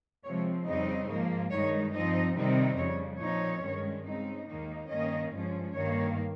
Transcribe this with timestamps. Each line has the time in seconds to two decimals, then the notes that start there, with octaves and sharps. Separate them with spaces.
0.24 C3 F3 G#3 C4 C#5
0.66 F2 C#3 G3 C4 D#4 D#5
1.08 G#2 F3 A#3
1.50 G2 D#3 G#3 D#4 C#5
1.93 G2 F3 C4 D#4 D#5
2.35 C3 D#3 G3 C4 D#4
2.77 F2 C#3 G3 C#5
3.20 A#2 F3 C4 D#4 C#5
3.62 G2 D#3 G#3 C#4
4.05 C#3 G#3 C4 D#4
4.46 D#2 D#3 A#3 D#4
4.89 G2 D#3 A#3 C#4 D#5
5.32 G2 F3 G#3 C#4
5.74 G2 D#3 A#3 C#5